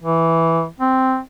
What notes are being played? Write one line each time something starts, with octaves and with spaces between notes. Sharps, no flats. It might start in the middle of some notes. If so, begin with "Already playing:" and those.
E3
C4